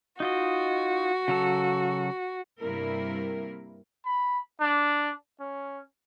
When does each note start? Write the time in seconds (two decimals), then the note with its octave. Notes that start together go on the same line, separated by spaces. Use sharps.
0.20 D#4 F4 F#4 D#5
1.28 C#3 F#3 A4
2.60 G2 C3 G3 A#3 E4 A#4
4.06 B5
4.61 D4
5.40 C#4